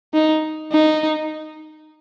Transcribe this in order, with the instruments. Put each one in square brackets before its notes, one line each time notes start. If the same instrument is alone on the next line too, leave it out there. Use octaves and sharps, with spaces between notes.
[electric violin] D#4
D#4